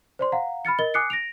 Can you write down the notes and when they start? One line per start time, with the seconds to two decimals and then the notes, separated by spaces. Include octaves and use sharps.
0.19 C5 D5 C6
0.32 F5 F#5 A#5
0.65 B5 F6 A6 C#7
0.79 A#4 D#5 A6 G7
0.94 G#5 D6 D#6 F#6 C7 C#7
1.10 A#6 D7 F7